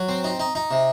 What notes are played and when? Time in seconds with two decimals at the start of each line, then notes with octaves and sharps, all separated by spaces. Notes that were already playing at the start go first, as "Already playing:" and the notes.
Already playing: F#3
0.09 C4
0.24 D#4
0.39 D#4
0.55 D#4
0.71 C3